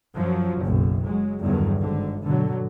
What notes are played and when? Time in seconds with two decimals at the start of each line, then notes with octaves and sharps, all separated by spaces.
0.16 F#2 F3 F#3
0.63 F#1 B1 F#2
1.05 F#3 G#3
1.42 E2 G2 D3 D#3 F#3
1.77 G#1 D3
2.22 B2 D3 F#3